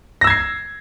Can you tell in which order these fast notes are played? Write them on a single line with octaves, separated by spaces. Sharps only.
A#6 E6 G#6 C7